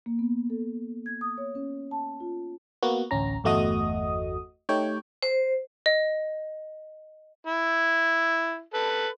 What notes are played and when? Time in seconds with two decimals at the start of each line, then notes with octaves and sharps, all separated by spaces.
0.06 A#3
0.19 B3
0.50 A4
1.06 G#6
1.21 D#6
1.38 C#5
1.55 C#4
1.91 A5
2.20 F4
2.83 A#3 B3 F#4
3.11 A1 D2 C#4 A#5
3.44 G1 E2 A3 F#4 D#5 D#6
4.69 A3 D#4 G4 C#5 G5
5.23 C5
5.86 D#5
7.47 E4
8.74 A4 B4